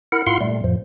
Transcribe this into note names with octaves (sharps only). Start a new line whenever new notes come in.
E4 A#4 F#5
G#2 E4 F4 F5 F#5 C6
A#2 G3 A3
F2 A2 F3